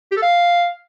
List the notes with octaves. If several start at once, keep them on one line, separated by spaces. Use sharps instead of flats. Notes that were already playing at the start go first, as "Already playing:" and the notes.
G4
A4
F5